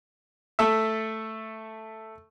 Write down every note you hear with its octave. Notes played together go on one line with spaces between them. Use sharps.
A3 A4 E5